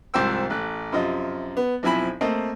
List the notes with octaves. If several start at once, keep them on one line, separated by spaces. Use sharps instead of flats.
C2 G#2 F3 C5 G5 E6
A1 F#6
F#2 C3 F3 F4 D#5
B3
B1 F3 C4 E4 G#5 B5
A3 A#3 C4 D#5